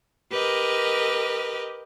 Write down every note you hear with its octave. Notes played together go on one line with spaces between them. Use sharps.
G4 A#4 B4 D#5